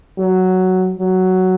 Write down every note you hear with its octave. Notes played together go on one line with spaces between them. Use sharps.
F#3
F#3